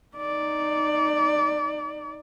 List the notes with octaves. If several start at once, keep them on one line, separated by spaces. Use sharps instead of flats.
D#4 D5